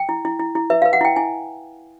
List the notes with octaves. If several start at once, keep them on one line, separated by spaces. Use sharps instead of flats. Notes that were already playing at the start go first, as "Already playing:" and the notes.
Already playing: G5
E4
E4
E4
E4
B4 E5
B4 F5
F#5
E4 G5
E4 G#5